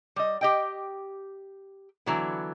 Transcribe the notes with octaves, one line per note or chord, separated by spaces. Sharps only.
G3 D#5
G4 D#5 G5
D3 E3 F#3 B3